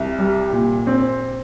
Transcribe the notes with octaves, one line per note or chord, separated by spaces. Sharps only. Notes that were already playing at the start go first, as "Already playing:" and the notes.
Already playing: C2
G3
A#2
C4